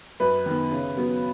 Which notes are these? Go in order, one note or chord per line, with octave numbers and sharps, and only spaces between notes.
F#2 B4
D#3 B3
C#3
F#3 B3